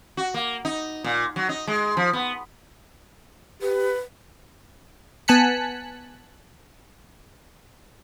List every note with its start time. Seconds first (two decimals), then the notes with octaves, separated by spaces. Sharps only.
0.17 F#4
0.34 A#3
0.65 D#4
1.04 A#2
1.36 F#3
1.49 D#4
1.67 G#3
1.97 F3
2.13 B3
3.62 G4 B4
5.28 B3 G#5 A5 F#6 B6 C#7